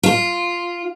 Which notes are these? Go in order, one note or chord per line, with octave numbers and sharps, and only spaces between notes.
F4